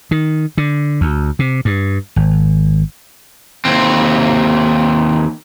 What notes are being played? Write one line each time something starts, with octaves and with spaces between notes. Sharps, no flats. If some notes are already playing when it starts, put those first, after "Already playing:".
D#3
D3
D2
C3
G2
G#1
D#2 C4